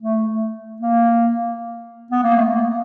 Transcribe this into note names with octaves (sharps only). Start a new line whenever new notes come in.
A3
A#3
B3
A#3
A3
A#3